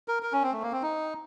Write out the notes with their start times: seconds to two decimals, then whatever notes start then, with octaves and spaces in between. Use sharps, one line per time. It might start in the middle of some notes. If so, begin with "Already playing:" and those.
0.08 A#4
0.23 A#4
0.33 C#4
0.43 C4
0.52 A3
0.62 A#3
0.72 C4
0.82 D#4